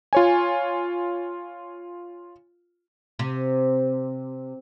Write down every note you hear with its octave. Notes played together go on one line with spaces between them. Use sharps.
F4 C#5 G#5
C3